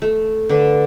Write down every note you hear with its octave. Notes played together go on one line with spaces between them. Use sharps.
A3
D3 B4